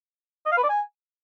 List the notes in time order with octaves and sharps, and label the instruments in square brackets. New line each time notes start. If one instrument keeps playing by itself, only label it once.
[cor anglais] D#5
F5
B4
D5
G#5